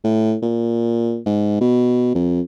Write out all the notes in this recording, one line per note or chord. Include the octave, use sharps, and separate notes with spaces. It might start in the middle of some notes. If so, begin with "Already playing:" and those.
A2
A#2
G#2
B2
F2